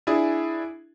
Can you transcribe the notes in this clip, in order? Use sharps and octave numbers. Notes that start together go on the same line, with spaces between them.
D4 E4 G#4